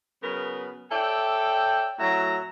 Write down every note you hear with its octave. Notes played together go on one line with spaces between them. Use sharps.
C#3 F#3 B3 A#4 B4
A4 C#5 D5 E5 G5
A2 F#3 C#4 E5 F#5 A#5